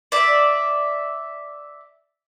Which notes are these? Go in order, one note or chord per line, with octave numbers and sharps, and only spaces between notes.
D5 E5